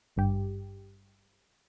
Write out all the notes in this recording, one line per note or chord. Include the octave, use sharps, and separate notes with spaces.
G#1 G2 G4